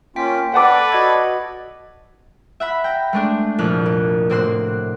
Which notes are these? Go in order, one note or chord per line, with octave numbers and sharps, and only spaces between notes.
A#3 C#4 F4 G5 B6
A4 B4 D5 F#5 A5 D6
F#4 D#5 G#6
E5 F#5 B5 B6
G5 A#5
G#3 A3 D4
C2 F2 A#2 F6 F#6
A#3
A2 A#3 C4 F#4 C6 F#6